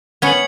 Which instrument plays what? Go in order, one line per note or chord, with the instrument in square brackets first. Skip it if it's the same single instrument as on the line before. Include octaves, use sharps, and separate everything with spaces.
[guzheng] B3 C#4 [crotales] G#6 C#7 F#7